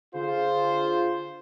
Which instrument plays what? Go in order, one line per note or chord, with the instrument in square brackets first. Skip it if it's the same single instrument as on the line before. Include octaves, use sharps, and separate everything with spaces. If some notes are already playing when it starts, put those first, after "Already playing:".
[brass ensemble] D3 F4 G#4 C5